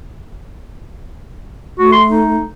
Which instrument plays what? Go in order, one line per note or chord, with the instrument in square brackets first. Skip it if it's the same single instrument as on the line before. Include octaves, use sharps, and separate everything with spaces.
[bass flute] A3 [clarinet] F#4
[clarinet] C6
D#4